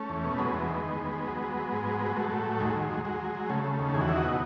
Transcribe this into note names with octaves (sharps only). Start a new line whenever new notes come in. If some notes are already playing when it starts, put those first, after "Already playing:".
Already playing: A3 C#4
E2
B2
A3
F#3 G#3 B3
E2
D#3
D#3
D#2
D#2
F#3
F#3
F#3
G#2
F#3
F#3
B3
F#3 A3
A2
F#3
D#2 G#3
D#2
F#3
F#3 G#3
F#3
F#3
C#3 A3
C#3
D#2
E2 G#4
F#4
F#3 E4
D#4 F#4
B2